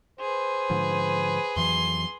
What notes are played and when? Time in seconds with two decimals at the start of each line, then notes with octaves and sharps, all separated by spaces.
0.20 G#4 B4 C5
0.70 G#2 D3 F3
1.56 F2 E3 F#3 C6